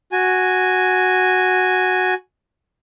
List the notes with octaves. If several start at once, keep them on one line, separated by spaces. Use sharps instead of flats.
F#4 G#5